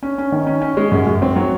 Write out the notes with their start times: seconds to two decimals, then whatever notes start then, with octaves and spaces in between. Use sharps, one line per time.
0.03 C#4
0.18 C#4
0.32 D#3
0.47 C#4
0.62 C#4
0.77 G#3
0.92 F#2
1.07 F#2
1.22 C4
1.36 F#3